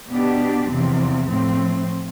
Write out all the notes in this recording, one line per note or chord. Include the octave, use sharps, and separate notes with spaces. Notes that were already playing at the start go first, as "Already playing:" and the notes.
B2 B3 D4 G4
E2 C3 F3 C4
A2 F3 C4